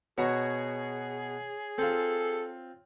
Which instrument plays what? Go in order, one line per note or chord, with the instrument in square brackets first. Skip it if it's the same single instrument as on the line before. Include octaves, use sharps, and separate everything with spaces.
[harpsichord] B2 F#4 A#5 [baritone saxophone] G#4 [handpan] C#5
[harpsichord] C4 F4 [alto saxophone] A4